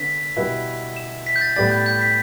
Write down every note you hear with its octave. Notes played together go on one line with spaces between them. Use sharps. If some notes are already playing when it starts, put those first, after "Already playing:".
Already playing: D3 B3 B6
B2 G3 E4 B4
E7
B6
G6
A6
A2 G3 B3 G4 D5 A6
G6
G6
B6